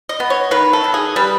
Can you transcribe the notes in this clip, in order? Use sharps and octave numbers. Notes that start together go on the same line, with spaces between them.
D#5
B3
C#5
D#3 B4
A4
D#3
G#4
G3 B4